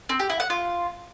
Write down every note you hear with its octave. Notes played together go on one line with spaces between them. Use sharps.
C4
G4
E4
F#5
F4